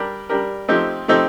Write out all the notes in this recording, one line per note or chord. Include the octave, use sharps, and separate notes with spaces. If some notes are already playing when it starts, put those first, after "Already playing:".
Already playing: G3 D4 G4 A#4
G3 D4 G4 A#4
F3 A3 C4 D#4 G4
F3 A3 C4 D#4 G4